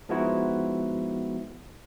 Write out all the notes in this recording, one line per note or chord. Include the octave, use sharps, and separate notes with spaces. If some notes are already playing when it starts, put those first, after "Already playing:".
F3 G#3 B3 D#4 E4 F#4